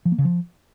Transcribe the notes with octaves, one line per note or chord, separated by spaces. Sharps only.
F3
A#3
C#3
F3